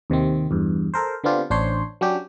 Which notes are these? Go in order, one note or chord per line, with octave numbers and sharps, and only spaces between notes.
D#2 C3 D#3 C4
E2 G2
A4 A#4 C5
D3 B3 C4 D4 F4 G4
A1 D4 C5 C#5 C6
F#3 C#4 D4 G4